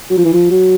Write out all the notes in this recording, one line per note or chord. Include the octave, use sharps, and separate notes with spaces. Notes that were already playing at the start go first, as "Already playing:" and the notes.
F#3
F3
E3
F3
F#3